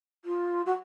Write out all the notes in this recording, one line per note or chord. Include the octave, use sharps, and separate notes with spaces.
F4
F#4